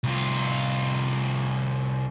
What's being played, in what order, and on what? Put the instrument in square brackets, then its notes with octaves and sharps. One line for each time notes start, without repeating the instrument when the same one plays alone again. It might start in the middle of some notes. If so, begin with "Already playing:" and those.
[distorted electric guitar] C2 F4